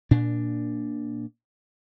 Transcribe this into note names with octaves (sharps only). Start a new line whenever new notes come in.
A#2 D4